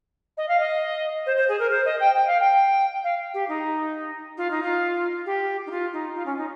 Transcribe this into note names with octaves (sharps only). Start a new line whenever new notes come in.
D#5
F5
D#5
C5
C5
G#4
A#4
C5
D#5
G5
G5
F5
G5
F5
G4
D#4
F4
D#4
F4
G4
D#4
F4
D#4
F4
C#4
D#4